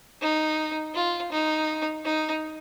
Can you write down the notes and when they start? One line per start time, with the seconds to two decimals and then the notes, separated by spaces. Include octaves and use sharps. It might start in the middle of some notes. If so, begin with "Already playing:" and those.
0.22 D#4
0.95 F4
1.32 D#4
2.05 D#4